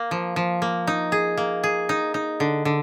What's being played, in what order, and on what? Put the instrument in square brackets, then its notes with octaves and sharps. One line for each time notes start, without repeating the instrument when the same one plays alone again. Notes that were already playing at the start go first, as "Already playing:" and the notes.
Already playing: [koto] A#3
F3
F3
A#3
D#4
G#4
A#3
G#4
D#4
D#4
D3
D3